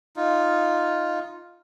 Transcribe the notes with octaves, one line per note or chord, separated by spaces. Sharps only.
D#4 F4